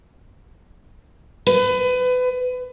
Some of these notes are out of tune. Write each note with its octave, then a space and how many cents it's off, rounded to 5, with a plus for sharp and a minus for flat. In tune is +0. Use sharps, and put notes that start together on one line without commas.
B4 +30